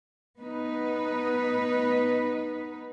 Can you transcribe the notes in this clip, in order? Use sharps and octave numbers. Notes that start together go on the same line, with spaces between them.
B3 D#4 B4